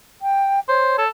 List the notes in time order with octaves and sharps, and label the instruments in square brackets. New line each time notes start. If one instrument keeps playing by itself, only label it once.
[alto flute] G5
[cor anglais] C5 [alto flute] C#5
[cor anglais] A4